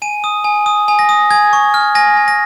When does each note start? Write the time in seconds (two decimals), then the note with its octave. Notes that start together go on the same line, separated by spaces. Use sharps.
0.02 G#5 D#7
0.24 D#6
0.44 G#5
0.66 D#6
0.88 G#5
0.99 A#6
1.09 D#6
1.30 G#5 G#6
1.53 C#6
1.74 F6
1.95 G#5 A#6
2.17 G#5
2.28 A#6